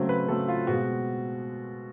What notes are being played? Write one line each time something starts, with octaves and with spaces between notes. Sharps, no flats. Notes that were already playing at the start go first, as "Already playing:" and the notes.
Already playing: C#3 F#3 A3 C4
B4
C#3 F#3 A3 C4 A4
F4
B2 G#3 C4 F#4